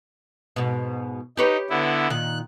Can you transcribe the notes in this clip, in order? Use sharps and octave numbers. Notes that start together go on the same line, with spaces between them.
G#2 B2
D#4 G4 B4 C#5
D3 B3 E4
A#2 D#3 F#6